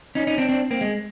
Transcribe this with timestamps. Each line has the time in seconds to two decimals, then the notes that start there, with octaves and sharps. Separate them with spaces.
0.15 C#4 D#4
0.27 C#4 D#4
0.38 C4 D4
0.49 C4 D4
0.71 A#3 C4
0.81 G#3